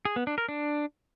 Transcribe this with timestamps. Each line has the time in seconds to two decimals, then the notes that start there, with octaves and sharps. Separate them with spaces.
0.05 G#4
0.16 B3
0.27 D4
0.38 A#4
0.49 D4